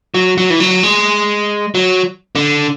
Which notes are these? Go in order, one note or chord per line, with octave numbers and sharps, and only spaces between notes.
F#3
F#3
E3
F#3
G#3
F#3
D3